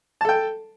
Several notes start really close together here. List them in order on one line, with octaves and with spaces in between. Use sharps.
A5 A4 G5